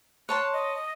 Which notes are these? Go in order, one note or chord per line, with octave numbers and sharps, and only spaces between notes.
C#5 A5 C6 F#6
D#5